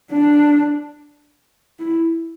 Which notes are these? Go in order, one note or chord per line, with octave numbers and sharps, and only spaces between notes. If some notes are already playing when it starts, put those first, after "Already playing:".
D4
E4